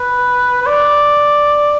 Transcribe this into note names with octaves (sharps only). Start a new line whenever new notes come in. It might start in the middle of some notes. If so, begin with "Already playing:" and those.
Already playing: B4
B4
D5